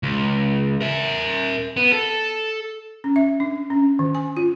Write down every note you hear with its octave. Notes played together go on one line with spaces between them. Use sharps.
C#2
A#4 E5
B3
A4
C#4
E5
D4
C#4
D#3
G#5
F4